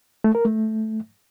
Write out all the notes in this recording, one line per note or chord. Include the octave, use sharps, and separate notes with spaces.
A3
A#4
A3